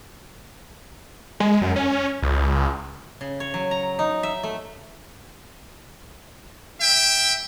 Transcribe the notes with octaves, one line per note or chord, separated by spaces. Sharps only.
G#3
F#2
C#4
C#2
C#3
C#5
F#3
A#5
D#4
E5
A3
E5 G5